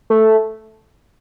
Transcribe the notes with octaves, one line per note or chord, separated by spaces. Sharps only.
A3